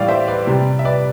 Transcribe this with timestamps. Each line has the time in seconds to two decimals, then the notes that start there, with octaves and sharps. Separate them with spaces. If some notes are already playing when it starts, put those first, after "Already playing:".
Already playing: A2 E3 G3 D5 F5
0.08 C5 E5
0.28 B4 D5
0.47 C3 G3
0.79 E5
0.85 B4 D5